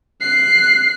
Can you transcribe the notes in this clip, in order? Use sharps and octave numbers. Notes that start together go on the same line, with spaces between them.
F#6 C7